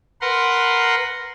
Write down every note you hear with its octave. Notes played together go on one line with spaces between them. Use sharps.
A#4 B4 F#5 C6